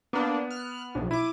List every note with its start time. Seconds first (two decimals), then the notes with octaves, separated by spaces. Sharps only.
0.13 A#3 B3 D4
0.51 F6 F#6
0.95 B1
1.11 E4 D6 D#7